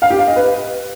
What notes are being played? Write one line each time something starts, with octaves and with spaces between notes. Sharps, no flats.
F5
G4
F5
D#5
B4